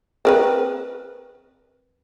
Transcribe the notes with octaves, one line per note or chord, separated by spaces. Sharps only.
C4 A#4 B4